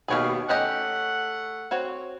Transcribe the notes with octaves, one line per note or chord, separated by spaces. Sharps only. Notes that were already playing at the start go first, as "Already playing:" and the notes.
D#2 B2 G#4 C#5 F5
A3 C#4 G4 D#5 F#5
C4 F#4 C#5